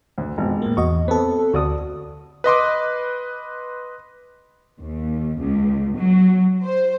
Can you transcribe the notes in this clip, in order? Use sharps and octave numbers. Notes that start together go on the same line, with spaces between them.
D2
G#1 F2 B2
A2 A#3
E2 F#4 D#5 C#6
B3 C4 A4
D2 F#4 D5 D#6
B4 D#5 C6 D6
D#2
C#2
F#3
C5